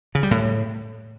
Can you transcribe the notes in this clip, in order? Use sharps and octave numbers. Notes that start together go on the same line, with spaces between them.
C#3
G3
A2